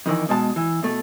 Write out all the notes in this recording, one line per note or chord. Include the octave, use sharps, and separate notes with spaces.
F2 D#3 E3
B2 G#3 A5
E3
B2 A3